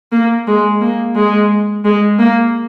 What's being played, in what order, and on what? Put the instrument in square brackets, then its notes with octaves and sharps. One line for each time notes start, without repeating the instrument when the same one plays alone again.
[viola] A#3
G#3
A#3
G#3
G#3
A#3